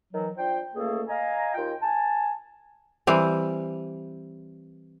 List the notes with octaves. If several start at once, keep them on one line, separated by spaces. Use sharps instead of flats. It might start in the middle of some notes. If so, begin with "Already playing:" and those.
D#3 E3 F#3
D4 F4 C5 G5
C#2 A3 A#3 G#4 A4
D#5 F5 G#5 A#5
D#2 F4 G5
G#5 A5
E3 G3 C4